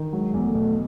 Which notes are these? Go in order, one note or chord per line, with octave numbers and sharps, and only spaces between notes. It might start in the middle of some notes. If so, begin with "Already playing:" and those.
Already playing: D#3
F#3 G#3
E2
A3
B2